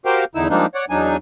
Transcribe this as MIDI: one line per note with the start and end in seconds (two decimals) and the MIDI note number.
0.05 0.25 66
0.05 0.25 67
0.05 0.25 70
0.05 0.25 72
0.05 0.25 77
0.05 0.25 79
0.35 0.48 40
0.35 0.48 50
0.35 0.48 63
0.35 0.48 64
0.35 0.48 88
0.50 0.66 53
0.50 0.66 55
0.50 0.66 56
0.50 0.66 58
0.50 0.66 62
0.50 0.66 63
0.75 0.85 73
0.75 0.85 74
0.75 0.85 78
0.90 1.17 40
0.90 1.17 54
0.90 1.17 62
0.90 1.17 63
0.90 1.17 80